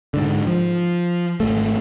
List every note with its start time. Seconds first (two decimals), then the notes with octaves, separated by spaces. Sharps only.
0.14 G#2 D3
0.47 F3
1.40 G#1 A3